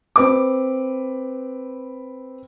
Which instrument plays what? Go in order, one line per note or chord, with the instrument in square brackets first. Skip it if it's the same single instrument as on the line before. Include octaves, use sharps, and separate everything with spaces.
[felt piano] C4 B4 D6